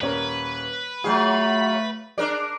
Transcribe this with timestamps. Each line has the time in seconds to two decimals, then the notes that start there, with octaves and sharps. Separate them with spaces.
0.01 D#1 C#4 A#4 B4
1.04 F#3 A3 F4 G#4 E5
2.18 D4 G#4 A#4 D5